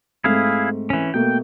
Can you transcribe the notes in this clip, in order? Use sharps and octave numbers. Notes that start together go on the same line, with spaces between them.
G#2 A3 C4 E4 G#4 F5
E3 C#4
B2 A3 A#3 G5